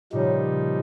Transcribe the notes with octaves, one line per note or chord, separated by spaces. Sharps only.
A#2 C#3 F3 G3 D#4